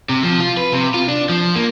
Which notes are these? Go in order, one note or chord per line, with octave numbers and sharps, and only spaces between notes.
C3
F3
F4
B4
C3
F4
D4
F3
A#3